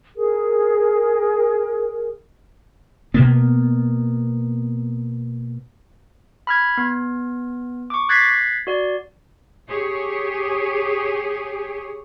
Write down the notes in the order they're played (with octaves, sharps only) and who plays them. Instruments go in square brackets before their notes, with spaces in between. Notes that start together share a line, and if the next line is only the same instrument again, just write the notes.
[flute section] G#4 A#4
[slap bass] B2 A#3 B3
[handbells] B5 F6 G#6
B3
C#6 D6
F#6 G#6 A6 B6 C7
F#4 D5
[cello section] G4 G#4 C#5